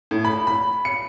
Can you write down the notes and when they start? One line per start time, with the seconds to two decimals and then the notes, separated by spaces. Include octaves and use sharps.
0.11 A2
0.25 B5
0.47 B5
0.85 C#7